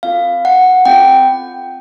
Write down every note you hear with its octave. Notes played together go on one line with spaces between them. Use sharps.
C4 F4 A4 F5
F#5
C4 F4 A4 G5